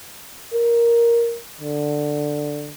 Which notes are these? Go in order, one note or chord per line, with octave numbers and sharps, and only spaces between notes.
A#4
D3